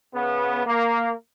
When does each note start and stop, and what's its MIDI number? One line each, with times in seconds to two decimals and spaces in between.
0.14 0.64 49
0.14 0.64 59
0.65 1.12 58